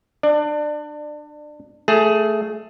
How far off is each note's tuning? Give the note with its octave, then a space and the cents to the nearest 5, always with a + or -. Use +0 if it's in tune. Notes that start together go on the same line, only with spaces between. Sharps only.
D4 +30 D5 +20
A3 +0 G#4 +15